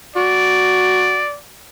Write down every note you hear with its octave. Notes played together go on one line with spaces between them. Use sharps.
F#4 D5